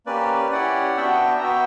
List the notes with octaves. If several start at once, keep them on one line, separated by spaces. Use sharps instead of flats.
A#3 C#4 G4 B4 D5
C#4 E4 G4 D5 F#5
B3 D4 F#4 E5 G5
A#5
B3 F#4 E5 G5